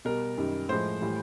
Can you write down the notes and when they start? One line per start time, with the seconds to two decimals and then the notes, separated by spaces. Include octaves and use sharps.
0.05 B2 G3 A#4
0.37 F#2 D#3 G3
0.69 A2 F3 G#3 C5
1.01 A2 E3 G3